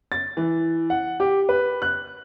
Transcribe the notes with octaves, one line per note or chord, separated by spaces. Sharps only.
A6
E3
F#5
G4
B4
F#6